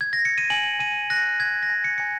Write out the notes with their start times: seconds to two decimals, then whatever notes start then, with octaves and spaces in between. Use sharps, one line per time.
0.01 G#6
0.13 A#6
0.25 C#7
0.38 D#7
0.50 G#5 F#7
0.79 G#5 D#7
1.10 F#6 A#6
1.40 F#6 G#6
1.63 A#6
1.70 G#5
1.84 C#7
1.98 G#5 C#7